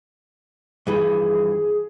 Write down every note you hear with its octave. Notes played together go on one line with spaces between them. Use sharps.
G2 E3 F3 G#4